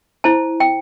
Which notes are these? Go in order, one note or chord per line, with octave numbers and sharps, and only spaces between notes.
E4 C5 A5
G5